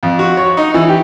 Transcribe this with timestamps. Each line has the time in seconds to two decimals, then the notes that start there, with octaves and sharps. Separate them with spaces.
0.03 F2
0.19 F#4
0.37 C#5
0.57 D#4
0.74 E3
0.88 G4